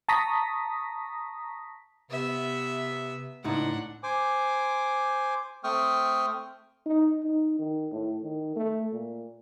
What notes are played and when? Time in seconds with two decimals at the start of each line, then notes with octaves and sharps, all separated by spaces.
0.09 A5 A#5 C#6 D#6 A#6 B6
2.11 C3 B3 E5
3.44 C#2 A2 D4 D#4 F#5
4.03 C5 G#5 D6
5.64 A3 C4 G5 C#6 D#6 F6
6.86 D#4
7.23 D#4
7.59 D#3
7.91 A2
8.23 D#3
8.56 A3
8.92 A#2